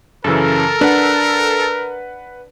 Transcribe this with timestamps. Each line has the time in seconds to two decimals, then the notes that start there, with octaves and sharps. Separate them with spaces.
0.24 F#2 C#3 E3 A4 A#4
0.81 D4 B4 F#5